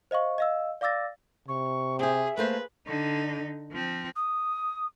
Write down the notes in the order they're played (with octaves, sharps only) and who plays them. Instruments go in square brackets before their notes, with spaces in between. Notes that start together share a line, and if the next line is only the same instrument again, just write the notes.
[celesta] C5 D#5 F5 C#6
D#5 F5 E6
D5 F5 D6 E6 A6 A#6
[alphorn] C3 [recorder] C#6
[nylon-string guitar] C4 G4 [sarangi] G#4 [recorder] E5
[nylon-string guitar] A3 A#3 C5 [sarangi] B4
[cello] D3 D#4
F3 C4
[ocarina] D#6